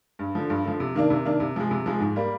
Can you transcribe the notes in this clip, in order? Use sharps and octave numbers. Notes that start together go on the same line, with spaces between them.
G2
D3 F3
G2
D3 F3
C3
D#3 A#3 D4
C3
D#3 A#3 D4
C3
F3 G#3
C3
F3 G#3
G#2
G3 A#3